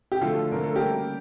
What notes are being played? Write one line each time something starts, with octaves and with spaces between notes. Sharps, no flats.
G4
D3 F3 A3 F4 A4
D3 F3 A3 A#4
A4
G4 A#4
C#3 G3 A#3